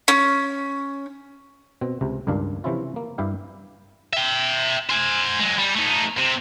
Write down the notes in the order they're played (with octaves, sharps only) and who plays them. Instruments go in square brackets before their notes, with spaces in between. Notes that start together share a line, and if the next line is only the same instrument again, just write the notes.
[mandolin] C#4
[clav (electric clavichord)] B2 C4
C#2 C3
C#2 G2 D#3 D4 F5
C3 E3 F3 C#4 E4 F4
A#3
G2 E4 G4 F5
[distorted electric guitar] E5 G5
C5 G#5
F#3 G#3
G3
A3 D#4
C3